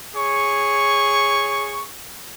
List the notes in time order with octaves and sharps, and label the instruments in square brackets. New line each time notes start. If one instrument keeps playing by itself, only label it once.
[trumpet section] G#4 C#5 C#6